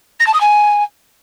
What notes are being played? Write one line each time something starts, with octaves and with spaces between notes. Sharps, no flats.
A#6
A5
D#6
G#5